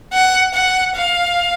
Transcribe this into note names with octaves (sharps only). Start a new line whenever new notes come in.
F#5
F#5
F5